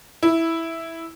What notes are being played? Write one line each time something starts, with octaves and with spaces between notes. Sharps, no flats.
E4